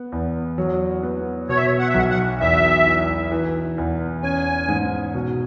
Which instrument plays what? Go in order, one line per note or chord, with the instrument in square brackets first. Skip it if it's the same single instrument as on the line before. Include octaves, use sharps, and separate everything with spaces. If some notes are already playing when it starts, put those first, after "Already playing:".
Already playing: [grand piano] B3
E2
F#3
B3
[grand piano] B2 [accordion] C#5
[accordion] E5
C#5
F#5
E5
[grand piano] B1 [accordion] F#5
[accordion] F#5
[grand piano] E2 [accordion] E5
[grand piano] E3
E3
E2
[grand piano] C#4 [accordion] G#5
[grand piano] G#2
B2